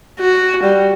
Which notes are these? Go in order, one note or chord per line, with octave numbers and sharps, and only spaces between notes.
F#4
G3